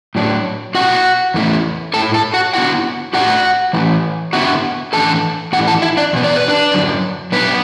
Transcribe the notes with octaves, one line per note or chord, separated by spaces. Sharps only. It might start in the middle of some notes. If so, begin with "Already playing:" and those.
A2 F#3 D4
B2 A3 E4 F#4 F#5
E2 E3 A3 E4
A2 A3 E4 A4 A5
A4 A5
F#4 F#5
D3 B3 E4 F#4 F#5
A2 A3 D4 F#4 F#5
A2 E3 A3 E4
D3 B3 E4 F#4 F#5
A2 E3 D4 A4 A5
A2 E3 A3 E4 F#4 F#5
A4 A5
E4 E5
D4 D5
E2 B2 B3
D5
B4
D4 D5
F#2 D3 F#3
B2 F#3 B3 D4 B4